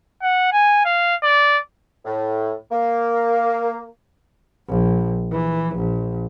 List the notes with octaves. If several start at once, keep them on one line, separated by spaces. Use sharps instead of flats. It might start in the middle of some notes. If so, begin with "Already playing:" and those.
F#5
G#5
F5
D5
A2
A#3
A#1
E3
A#1